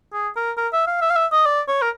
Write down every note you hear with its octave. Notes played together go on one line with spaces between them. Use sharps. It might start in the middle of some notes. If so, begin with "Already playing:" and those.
G#4
A#4
A#4
E5
F5
E5
F5
E5
D#5
D5
C#5
A#4